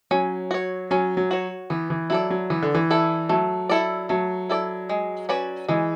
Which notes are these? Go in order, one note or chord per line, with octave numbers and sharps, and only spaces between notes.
F#3 C#4
F#4 C#5
F#3 C#4
F#3
F#4 C#5
E3 B3
E3
F#3 E4 A4 D5
F#3
E3 B3
D3
E3
E4 A4 D5
F#3 A3
E4 A4 D5
F#3 A3
E4 A4 D5
G#3
C#4 F#4 B4 D5
E3 G#3